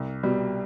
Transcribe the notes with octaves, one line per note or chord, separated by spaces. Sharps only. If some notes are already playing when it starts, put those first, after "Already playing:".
Already playing: C2
B2 G3